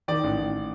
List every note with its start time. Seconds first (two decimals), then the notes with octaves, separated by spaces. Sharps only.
0.08 D#3 D5
0.24 A1
0.38 A1